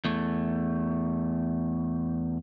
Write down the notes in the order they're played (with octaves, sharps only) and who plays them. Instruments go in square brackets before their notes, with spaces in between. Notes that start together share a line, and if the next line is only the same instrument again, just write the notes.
[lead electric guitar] E2 A3